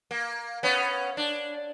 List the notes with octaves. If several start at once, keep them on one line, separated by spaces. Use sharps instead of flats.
A#3
B3 C#4
D4